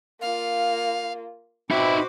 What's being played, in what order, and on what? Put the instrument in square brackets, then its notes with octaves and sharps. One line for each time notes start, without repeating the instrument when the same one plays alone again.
[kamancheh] A#3 F4 [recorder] F5
[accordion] B2 C4 B5 [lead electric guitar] D#4 E5 [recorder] F#4 [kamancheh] C5 D6